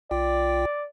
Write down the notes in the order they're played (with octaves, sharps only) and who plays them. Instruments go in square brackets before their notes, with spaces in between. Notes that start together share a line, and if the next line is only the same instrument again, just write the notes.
[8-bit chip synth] B1 F4 G5 [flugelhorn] D5